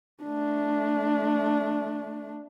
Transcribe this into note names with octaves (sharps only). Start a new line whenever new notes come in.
A3 D4